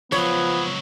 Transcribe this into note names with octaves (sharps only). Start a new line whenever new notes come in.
C#2 F3 F#3 B3 C#5